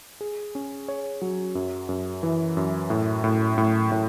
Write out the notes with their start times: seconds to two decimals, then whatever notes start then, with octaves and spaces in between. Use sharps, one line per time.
0.21 G#4
0.55 C#4
0.88 C#5
1.22 F#3
1.55 F#2
1.89 F#2
2.23 E3
2.57 F#2
2.90 A2
3.24 A2
3.58 A2
3.92 A2